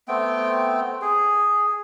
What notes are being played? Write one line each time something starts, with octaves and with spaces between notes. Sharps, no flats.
A3 B3 C4 G5
G#4